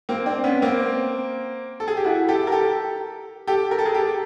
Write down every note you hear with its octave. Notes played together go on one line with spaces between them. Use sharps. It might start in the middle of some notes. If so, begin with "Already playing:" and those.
A#3 C4
C4 D4
B3 C#4
A#3 C4
A4
G#4
G4
E4 F#4
G4 A4
A#4
G4 A4
G4 A4
A#4
A4
G#4 A#4
G4 A4